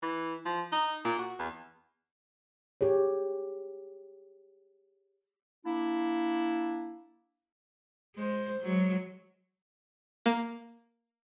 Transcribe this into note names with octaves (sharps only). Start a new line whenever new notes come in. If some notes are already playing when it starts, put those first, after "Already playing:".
E3
F3
D#4
A#2
F#4
E2
G4 G#4 C#5
A#3 D4 E4
G#3 C5
F#3 G#3
A#3